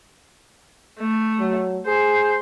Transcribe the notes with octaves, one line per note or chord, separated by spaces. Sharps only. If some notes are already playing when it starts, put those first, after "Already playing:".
A3
F#3
G#4 C5